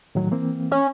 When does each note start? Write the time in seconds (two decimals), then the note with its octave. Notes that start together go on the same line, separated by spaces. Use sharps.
0.15 A2 D#3 F#3
0.31 E3 A#3 C4
0.71 C#4